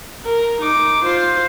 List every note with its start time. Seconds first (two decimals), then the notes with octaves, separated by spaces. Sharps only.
0.25 A#4
0.61 D#4 D6
1.03 F4 C5